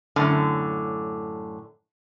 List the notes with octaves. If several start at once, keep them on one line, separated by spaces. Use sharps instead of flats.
F#2 A2 D3